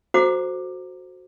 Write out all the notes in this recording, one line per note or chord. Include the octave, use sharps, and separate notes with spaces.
F#4 A4 C5 F#5 A#5 D6